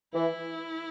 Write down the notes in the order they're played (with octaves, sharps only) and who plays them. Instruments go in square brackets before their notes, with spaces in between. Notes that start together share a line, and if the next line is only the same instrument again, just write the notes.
[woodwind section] E3 [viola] E4